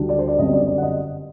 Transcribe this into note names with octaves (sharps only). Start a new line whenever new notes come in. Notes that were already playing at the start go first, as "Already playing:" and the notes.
Already playing: D2 D3 G3 D4
D5
C5
D5
G1 F#2 D3 G3 C4 D#5
D5
D5
F#5
D#5